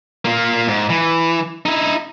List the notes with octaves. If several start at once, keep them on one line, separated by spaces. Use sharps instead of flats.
A#3 F4
G#2
E3
D#4 E4